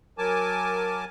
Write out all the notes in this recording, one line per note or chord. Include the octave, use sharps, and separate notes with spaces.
F#3 A#4 G#5 A5 D6